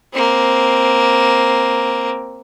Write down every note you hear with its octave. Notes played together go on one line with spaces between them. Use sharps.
A#3 C4